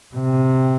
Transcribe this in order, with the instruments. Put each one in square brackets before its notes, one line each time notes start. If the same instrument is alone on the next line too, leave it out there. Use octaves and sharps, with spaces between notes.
[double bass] C3